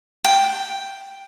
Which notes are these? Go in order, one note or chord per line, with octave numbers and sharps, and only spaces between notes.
G5